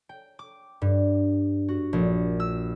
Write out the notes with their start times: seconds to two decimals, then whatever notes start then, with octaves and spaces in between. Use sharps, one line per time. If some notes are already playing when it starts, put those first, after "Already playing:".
0.09 G5
0.39 D6
0.82 G2
1.69 F#4
1.93 A#1
2.40 E6